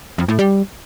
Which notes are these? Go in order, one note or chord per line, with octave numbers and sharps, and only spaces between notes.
F2
A2
G3